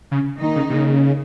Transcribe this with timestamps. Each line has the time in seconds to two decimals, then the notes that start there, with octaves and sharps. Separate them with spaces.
0.11 C#3
0.38 D#3 A#3 D#4
0.56 C#3
0.70 C3
0.74 C#3